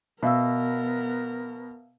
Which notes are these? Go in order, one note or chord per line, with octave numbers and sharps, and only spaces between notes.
B2 B3 A#4 E5 F5 E6